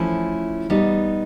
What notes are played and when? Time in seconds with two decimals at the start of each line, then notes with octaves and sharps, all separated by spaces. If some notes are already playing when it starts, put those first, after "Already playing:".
Already playing: F3 A3 C#4 E4
0.70 G3 B3 D#4